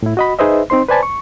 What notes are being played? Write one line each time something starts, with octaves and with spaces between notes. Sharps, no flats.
A2 E4
F#4 D#5 B5
D#4 G#4 B4 C5 D#5 E5
C4 D#4 C5 C6
B4 C5 D5 G#5 A5 B5
C#6